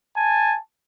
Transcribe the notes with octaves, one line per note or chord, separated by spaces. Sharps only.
G#5 A5